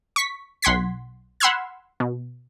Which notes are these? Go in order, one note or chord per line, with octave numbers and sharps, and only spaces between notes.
C#6 B6
B1 F#5 C6 G#6 B6
F#5 B5 C6 E6 F6 G#6
B2